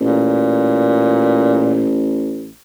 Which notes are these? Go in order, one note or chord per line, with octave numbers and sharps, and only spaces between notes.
A1 A#2